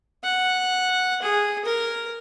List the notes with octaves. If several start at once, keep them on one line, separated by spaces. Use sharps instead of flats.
F#5
G#4
A#4